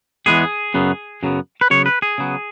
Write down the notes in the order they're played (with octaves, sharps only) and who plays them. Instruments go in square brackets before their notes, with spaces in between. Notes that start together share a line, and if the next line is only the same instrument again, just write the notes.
[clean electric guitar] E2 E3 G#3 B3 G#4
F#2 C#3 F#3 B3
F#2 C#3 F#3 B3
B4
C#3 F#3 B3 C#5
B4
G#4
C#3 F#3 B3